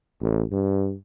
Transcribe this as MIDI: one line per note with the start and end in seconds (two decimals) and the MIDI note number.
0.22 0.43 33
0.52 0.95 43